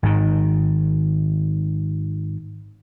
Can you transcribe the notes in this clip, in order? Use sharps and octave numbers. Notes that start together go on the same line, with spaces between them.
G#1 G#2 D#3